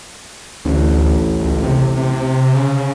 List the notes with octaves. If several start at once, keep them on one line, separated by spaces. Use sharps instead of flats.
A1 D2
C#2
C3
C3
C#3